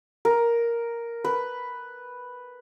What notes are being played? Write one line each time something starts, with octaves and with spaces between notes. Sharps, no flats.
A#4
B4